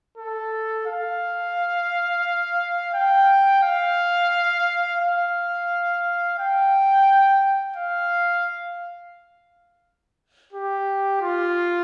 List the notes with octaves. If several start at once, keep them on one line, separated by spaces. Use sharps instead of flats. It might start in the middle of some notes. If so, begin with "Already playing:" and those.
A4
F5
G5
F5
F5
G5
F5
G4
F4